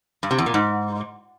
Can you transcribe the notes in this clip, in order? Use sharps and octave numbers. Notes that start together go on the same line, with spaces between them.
G2
C3
E2
A#2
G#2